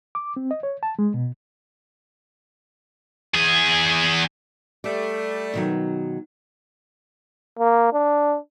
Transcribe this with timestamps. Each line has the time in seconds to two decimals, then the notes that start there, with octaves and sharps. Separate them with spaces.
0.15 D6
0.36 C4
0.51 D#5
0.63 C#5
0.83 A5
0.99 G#3
1.14 B2
3.34 E2 G#4
4.84 G3 A3 D5
5.54 B2 D#3 F#3
7.59 A#3
7.93 D4